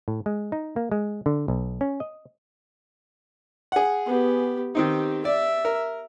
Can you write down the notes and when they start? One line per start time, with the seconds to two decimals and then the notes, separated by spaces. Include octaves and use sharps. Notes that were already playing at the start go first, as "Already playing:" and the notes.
0.08 A2
0.26 G#3
0.52 D#4
0.76 A#3
0.92 G#3
1.26 D3
1.48 B1
1.81 C#4
2.00 D#5
3.72 G#4 F#5
4.06 B3 G4
4.75 D#3 C4 D#4 G4
5.25 D5 E5
5.65 A#4